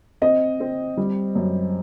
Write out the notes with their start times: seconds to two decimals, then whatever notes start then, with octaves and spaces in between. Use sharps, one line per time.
0.22 C4 D#5
0.60 C4
0.97 G3
1.35 F#2